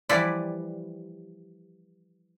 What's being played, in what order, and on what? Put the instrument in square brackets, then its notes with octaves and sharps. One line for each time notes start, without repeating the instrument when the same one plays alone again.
[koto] E3 F3 G3 E4 B4 D5